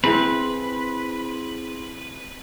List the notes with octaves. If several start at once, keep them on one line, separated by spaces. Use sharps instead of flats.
C4 E4 G#4 B4 C6